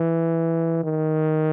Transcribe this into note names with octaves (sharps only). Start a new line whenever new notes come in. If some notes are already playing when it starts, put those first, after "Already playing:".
Already playing: E3
D#3